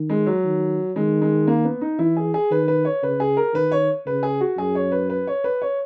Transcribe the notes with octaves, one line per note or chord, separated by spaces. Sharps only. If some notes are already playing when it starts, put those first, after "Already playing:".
Already playing: D#3
G#3
F#3
D#3
D#3 G#3
G#3
A#3
B3
D#4
E3 E4
G#4
G#4
D#3 B4
B4
C#5
C#3 B4
G#4
A#4
D#3 B4
C#5
C#3 B4
G#4
F#4
F#2 G#4
C#5
B4
B4
C#5
B4
C#5